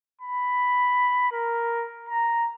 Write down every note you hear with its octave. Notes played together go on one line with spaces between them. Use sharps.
B5
A#4
A#5